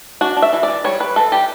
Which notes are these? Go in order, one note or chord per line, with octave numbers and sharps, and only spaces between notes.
D4 F#4
D4
E5
E3
D5
E3
G3 C#5
G3 B4
E3 A4
G3 G4